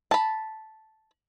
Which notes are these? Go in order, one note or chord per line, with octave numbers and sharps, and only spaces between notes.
A5 B5